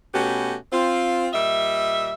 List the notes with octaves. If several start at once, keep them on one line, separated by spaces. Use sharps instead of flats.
B2 A3 B3 C#4 F#4 G4
C4 F4
A#2 G3 D#5 E5